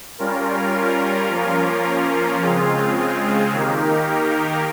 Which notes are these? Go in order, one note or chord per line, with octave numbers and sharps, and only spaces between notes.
G3 C#4 F4 A#4
F3 A#3 C#4 F4 A#4
C#3 G#3 C4 F4 G#4
D#3 A#3 D#4 G4 A#4